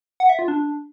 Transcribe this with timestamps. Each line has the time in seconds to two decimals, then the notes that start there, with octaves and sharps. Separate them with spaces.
0.20 F#5
0.29 E5
0.39 F4
0.48 D4